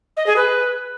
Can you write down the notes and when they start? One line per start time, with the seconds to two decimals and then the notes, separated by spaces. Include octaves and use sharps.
0.17 D#5
0.26 G#4
0.36 B4